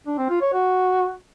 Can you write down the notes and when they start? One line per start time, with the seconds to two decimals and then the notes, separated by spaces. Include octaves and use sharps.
0.06 D4
0.18 C4
0.30 F4
0.41 C#5
0.53 F#4